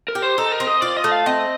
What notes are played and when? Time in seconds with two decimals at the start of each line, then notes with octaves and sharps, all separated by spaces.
0.08 A#4
0.15 G4
0.22 C5
0.38 D#4 A4
0.52 A#4
0.60 C4
0.67 D#5
0.81 F4 D5
0.97 D#5
1.04 A3
1.12 F5
1.26 C4 D#5